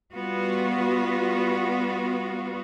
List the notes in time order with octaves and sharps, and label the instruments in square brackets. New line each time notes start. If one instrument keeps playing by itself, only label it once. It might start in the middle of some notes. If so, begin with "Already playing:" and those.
[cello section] G3 B3 F4 F#4